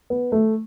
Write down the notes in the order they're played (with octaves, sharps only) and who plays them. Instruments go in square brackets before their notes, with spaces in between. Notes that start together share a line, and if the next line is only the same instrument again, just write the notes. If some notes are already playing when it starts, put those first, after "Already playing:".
[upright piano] B3
A3